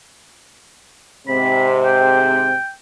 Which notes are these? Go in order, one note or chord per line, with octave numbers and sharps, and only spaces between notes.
G#2 C3 C4 B5
G5